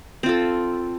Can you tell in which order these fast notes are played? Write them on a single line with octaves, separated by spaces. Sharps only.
C4 F4 A4